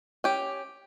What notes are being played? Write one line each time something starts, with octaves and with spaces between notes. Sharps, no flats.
C#4 G4